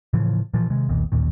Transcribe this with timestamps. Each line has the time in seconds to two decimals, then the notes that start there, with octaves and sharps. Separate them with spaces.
0.13 A2 C#3 E3 F3
0.54 A#2 E3 F3
0.70 C3 D#3 G#3
0.88 E1 B1 A#2 D#3
1.12 A1 D#2 A#2 D#3